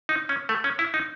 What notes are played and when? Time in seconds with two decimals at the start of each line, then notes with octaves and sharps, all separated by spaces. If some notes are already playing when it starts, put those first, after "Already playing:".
0.09 D#4
0.29 C#4
0.49 A3
0.64 C#4
0.79 E4
0.94 D#4